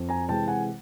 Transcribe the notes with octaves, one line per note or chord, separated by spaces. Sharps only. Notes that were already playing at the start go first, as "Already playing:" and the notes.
Already playing: F2
G#5 A#5
C3 E3 G#3 G5 A5
F#5 G#5